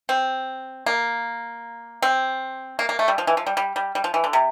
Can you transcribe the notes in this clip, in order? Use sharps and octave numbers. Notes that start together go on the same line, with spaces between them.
C4
A#3
C4
A#3
A#3
A3
G3
F3
E3
F3
G3
G3
G3
G3
F3
E3
D3
C3